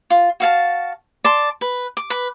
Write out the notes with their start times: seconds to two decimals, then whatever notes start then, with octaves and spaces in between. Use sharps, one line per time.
0.10 F4
0.40 F#4 F5 A5
1.24 D5 A5 C6
1.61 B4
1.97 D6
2.10 B4